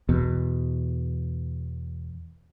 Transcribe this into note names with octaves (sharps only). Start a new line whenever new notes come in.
E2 B2